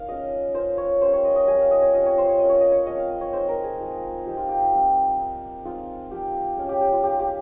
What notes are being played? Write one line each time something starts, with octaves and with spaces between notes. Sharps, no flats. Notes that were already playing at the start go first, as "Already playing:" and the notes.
Already playing: A#3 D#4 F5
G#3 C#4 F4 D#5
A#3 C#4 F4 C5
C#5
G3 A#3 C#4 C5
C#5
D#5
D#5
G3 C#4 F4 G#5
F5
D#5
C#5
G3 C4 F4 D#5
C#5
C5
C#5
A#3 C#4 F4 D#5
C#5
D#5
C#5
F3 G#3 C4 F4 D#5
F5
D#5
C#5
G#3 C4 D#4 C5
A#4
G#4
F3 G#3 D#4
F3 C4 D#4 G4
F4
G4
G4
G3 C4 F4
A#3 D#4
G#3 C4 D#4 F4
F3 C4 F4 G4
G#3 C#4 F4
G4
G4
F4
G#3 D#4 G4
G4